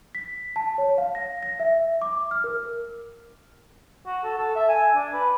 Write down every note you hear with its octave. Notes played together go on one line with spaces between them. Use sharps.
B6
A5
C#5
F5
A#6
A#6
E5
D6
F6
A#4
F#4
A4
A4
E5
G#5
D4
B4